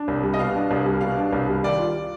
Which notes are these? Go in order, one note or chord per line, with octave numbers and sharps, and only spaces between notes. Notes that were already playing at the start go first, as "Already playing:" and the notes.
Already playing: D4
C2
G3
D#5
B2 F5
D4
C2
G3
B2 F5
D4
C2
G3
D#3 D5
F4